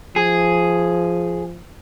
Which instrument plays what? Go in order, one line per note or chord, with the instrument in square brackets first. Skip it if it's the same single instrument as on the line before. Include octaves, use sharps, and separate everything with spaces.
[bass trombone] F3 [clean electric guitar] G#4